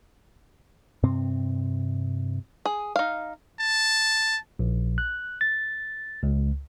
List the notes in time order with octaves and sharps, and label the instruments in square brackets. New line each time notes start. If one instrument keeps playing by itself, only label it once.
[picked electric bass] G2 C3 C4
[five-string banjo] G#4
D#4 F5
[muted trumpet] A5
[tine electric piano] A#1
F#6
A6
C#2